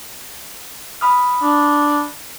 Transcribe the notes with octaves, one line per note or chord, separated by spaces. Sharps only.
B5 D#6 F6
D4